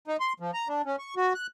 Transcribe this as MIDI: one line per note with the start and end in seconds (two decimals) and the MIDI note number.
0.08 0.17 63
0.20 0.33 84
0.40 0.51 53
0.54 0.68 82
0.68 0.82 62
0.85 0.96 61
0.99 1.15 85
1.17 1.33 66
1.35 1.47 90